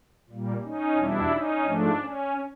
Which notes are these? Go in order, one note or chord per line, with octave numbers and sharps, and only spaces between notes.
A#2 G3 A#3
C#4 D#4
E2 B2 G3 D4 E4
C#4 D#4
G#2 F3 A3 D4
C#4